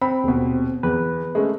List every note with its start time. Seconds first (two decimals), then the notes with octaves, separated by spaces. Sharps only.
0.01 C4 B5
0.24 D#1 B2
0.83 E2 B4
1.35 G#3 A3 C#4